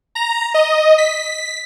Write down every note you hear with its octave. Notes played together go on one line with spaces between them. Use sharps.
A#5
D#5
B6